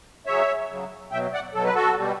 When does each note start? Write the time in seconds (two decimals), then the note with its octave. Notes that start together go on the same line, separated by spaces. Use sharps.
0.26 C#3 F#3 C#5 E5
0.69 C#3 F#3
1.12 B2 F#3 E5 G5
1.33 D5 F#5
1.54 B2 F#3 A4
1.64 B4
1.75 F#4 A4
1.97 B2 G3